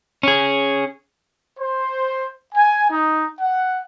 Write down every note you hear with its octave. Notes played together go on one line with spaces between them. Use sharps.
C#4 G#4
C5
G#5
D#4
F#5